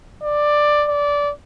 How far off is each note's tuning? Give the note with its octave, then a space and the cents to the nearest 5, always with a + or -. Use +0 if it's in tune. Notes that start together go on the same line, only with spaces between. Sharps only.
D5 +10
D5 -20